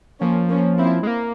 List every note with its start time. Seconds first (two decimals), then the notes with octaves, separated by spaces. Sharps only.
0.21 F3 A#3 C#4
0.49 A#3 C#4
0.78 C4 E4
1.03 G#3
1.07 A#3